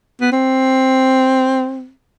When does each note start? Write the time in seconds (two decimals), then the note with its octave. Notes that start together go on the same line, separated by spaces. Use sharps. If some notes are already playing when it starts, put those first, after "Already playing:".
0.21 B3
0.33 C4